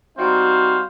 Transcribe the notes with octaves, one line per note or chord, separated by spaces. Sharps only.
G3 C4 D#4 F#4 C5 F5